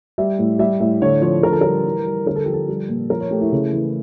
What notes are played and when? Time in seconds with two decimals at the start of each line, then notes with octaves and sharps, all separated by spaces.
0.18 G3 E5
0.39 A2
0.59 G3 E5
0.80 A2 E5
1.02 D3 C#5
1.22 F3 C#5
1.43 D3 A#4
1.52 A4
1.61 G3 A#4
1.85 E3
2.06 G3
2.26 D3 A#4
2.35 A4
2.44 F3 G4
2.53 A4
2.68 G3
2.89 A#2
3.10 F3 A#4
3.21 C#5
3.31 A3 G4
3.41 E4
3.52 C#3
3.73 E3